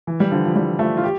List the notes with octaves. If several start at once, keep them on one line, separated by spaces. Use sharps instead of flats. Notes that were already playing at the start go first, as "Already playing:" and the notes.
E3
G3
D3 F3
F3
E3 G3
F3 A3
F4
G4